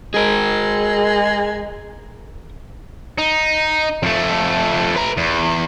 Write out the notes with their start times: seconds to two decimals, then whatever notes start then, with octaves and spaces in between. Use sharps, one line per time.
0.14 G#3 G#4 A#4
3.18 D#4
4.03 F2 A3
4.96 B4 A#5
5.17 E2